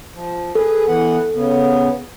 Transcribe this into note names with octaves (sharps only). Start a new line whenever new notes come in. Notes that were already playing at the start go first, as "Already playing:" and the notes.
F3
G#4 A4 B4
E3 B3 F#5
C#3 B3